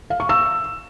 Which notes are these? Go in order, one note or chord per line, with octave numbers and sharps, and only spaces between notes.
F5
C#6
E6